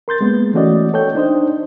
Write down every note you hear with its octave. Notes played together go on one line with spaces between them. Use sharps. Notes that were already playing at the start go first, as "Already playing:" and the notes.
A#4 C6 G6 A6
G#3 A#3 B3
E3 A3 C#4 F#4 D5 D#5
A4 C#5 G5 G6
D4 D#4 C5 D#5